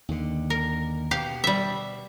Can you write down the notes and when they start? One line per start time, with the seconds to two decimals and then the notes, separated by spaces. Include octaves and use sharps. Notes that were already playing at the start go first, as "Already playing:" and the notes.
0.09 D#2 D3
0.50 A#4
1.11 B2 G4 F5
1.44 G3 E5